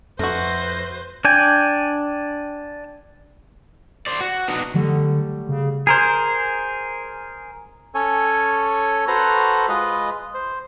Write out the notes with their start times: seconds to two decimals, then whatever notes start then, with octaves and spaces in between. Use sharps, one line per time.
0.19 F2 A3 F#4 B4 C5 A#6
1.25 D4 D5 G5 G#5
4.07 C5 D5
4.21 F#4
4.48 B3 D4 D#4 F#4
4.74 D3 F#3 G3 A3
5.49 C#3
5.87 G#4 A#4 C5
7.95 C#4 A4 C#5 G#5
9.08 F#4 A4 B4 C5 A#5
9.69 G#3 F4 B4 D#5
10.34 C5